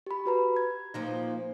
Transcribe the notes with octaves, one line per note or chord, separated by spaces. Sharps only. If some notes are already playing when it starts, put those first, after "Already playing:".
G4 B5
F#4 B4 A#5
G#6
A#2 F3 D#4